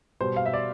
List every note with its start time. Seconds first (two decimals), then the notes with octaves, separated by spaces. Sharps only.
0.20 B2 G3 C5
0.36 F5
0.46 E5
0.53 D5